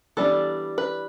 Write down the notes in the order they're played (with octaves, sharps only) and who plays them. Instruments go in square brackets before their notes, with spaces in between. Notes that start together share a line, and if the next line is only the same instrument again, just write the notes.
[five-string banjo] E3 G3 B3 D4 A4
B4